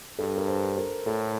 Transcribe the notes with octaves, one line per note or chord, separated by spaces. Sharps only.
G2 A4
A#4
C5
A#4
A2 A4